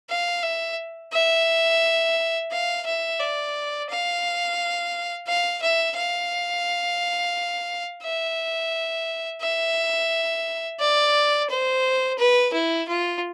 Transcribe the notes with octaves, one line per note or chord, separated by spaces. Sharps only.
F5
E5
E5
F5
E5
D5
F5
F5
E5
F5
E5
E5
D5
C5
B4
E4
F4